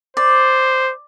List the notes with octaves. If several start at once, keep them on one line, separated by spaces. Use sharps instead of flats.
C5 D5